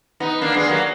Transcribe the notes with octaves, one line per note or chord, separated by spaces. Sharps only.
B3 D#4
A#3 D4
G#3 B3
F#3 A#3